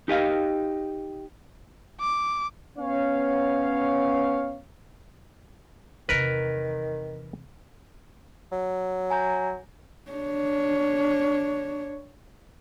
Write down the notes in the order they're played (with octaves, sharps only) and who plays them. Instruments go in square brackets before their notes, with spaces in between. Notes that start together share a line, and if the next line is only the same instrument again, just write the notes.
[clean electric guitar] D#4 G4 D#5 F5
[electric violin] D6
[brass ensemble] B3 C#4 C#5 F5
[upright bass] E2 C3 [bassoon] D#3 [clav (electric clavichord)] A#4 B4
[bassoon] F#3
[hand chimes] G#5 A#5 G6
[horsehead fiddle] D4 C#5